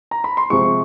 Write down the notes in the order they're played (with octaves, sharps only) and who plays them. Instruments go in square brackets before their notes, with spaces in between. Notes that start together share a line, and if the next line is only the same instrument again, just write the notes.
[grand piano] A#5
B5
C6
C3 F3 G#3 C#6